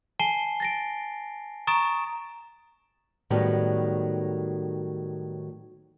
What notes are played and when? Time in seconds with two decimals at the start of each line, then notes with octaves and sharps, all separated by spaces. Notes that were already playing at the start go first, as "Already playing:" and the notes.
0.19 G#5 A5 C7 G7
0.60 A6 A#6 D7
1.67 A#5 C#6 D#6 A6 D7 E7
3.30 A2 D#3 F#3 G3 B3